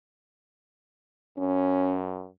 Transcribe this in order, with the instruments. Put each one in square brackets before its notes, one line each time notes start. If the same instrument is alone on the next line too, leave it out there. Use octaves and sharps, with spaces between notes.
[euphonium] F#2 [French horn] C#4